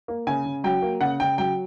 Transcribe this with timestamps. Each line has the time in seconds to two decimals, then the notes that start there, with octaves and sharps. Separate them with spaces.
0.08 A#3
0.27 C#3 G#5
0.45 C#3
0.64 F#3 G5
0.82 A#3
1.01 C#3 F#5
1.20 C#3 G5
1.38 F#3 G5